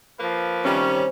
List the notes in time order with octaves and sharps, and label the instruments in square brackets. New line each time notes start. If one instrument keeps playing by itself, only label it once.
[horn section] F3 A#3 B4
[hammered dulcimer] C3 C#5 G#5 [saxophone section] D#3 G3 C#4